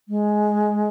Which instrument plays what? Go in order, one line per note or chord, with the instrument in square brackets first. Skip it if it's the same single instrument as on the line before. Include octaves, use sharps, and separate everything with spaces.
[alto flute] G#3